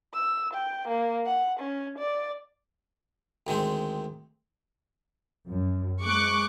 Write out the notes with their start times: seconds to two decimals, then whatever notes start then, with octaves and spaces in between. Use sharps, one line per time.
0.14 E6
0.54 G5
0.88 A#3
1.26 F#5
1.60 C#4
1.98 D5
3.47 D2 D#3 G#3 C4
5.49 F#2
6.02 G#3 C#6 D6 F#6